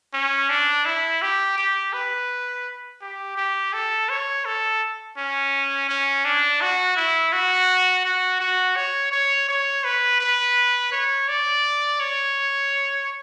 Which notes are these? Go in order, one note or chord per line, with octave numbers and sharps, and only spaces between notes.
C#4
D4
E4
G4
G4
B4
G4
G4
A4
C#5
A4
C#4
C#4
D4
F#4
E4
F#4
F#4
F#4
C#5
C#5
C#5
B4
B4
C#5
D5
C#5